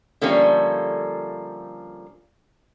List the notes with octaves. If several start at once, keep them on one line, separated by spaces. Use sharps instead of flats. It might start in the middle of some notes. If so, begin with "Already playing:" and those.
D3 F3 G3 A3 A#3 C#4